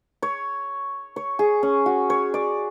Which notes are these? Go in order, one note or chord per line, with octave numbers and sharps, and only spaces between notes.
C#5
C#5
G#4
C#4
F#4
C#5
D5